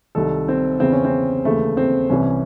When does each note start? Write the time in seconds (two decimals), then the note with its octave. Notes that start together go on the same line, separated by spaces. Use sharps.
0.15 C2 C3 D#3 A4
0.48 C4
0.80 E2 C#3 E3 C4
0.92 C#4
1.05 C4
1.45 D#2 C#3 E3 A3
1.77 C4
2.10 C2 C3 E3 C#4